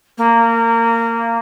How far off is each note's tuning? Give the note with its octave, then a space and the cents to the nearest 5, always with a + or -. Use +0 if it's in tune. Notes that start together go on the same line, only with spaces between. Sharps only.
A#3 -20